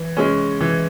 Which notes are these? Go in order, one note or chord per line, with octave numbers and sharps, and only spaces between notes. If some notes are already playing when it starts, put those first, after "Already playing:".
Already playing: E3
G#3 C#4
E3